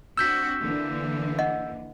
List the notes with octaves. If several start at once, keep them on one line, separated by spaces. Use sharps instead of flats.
C4 D4 F#4 E6 G6 B6
D3 E3 A#3
D#5 F#5